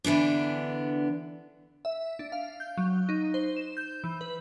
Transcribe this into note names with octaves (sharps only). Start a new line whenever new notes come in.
D3 E3 B3 D4
E5
D4
F5
G6
F#3
D#4
C5
E7
G6
E3
B4